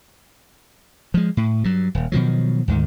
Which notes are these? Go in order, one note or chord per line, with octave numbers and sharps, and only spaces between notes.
F3 G#3
A2
G2 F#3
D#1
B2 D#3 F3 F#3
D2 G#2 D#3